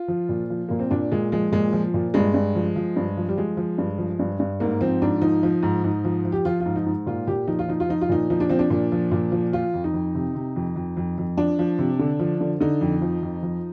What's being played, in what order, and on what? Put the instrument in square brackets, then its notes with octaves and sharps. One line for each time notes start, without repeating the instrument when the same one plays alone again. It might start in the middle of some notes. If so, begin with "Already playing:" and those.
Already playing: [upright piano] F4
F3
A#2
F3
A#2 A#3
C4
A#2 D4
A#2 G#3
F3 G#3
A#2 G#3
F3
A#2
G2 G#3
G2
F3
F3
G2
F3
G3
F3 G#3
F3
G2
F3
G2
G2
G#2 A#3
F3 C4
G#2 D4
F3 D#4
F3
G#2
G#2
F3
F3
G4
F3 F4
F4
G#2
D#4
G#2
A#2 F4
A#2 G4
F3 D#4
F4
F3 D#4
F4
F3 D#4
F4
A#2 D#4
F3 D#4
D4
F3 C4
D4
A#2
F3
A#2
F3
F3 F4
F2
D#4
F2
C3
C3
F2
F2
F2
F2
F3 D4
F3
C3
D3
F3
D3
D3 D#4
F2
F3
F2
F3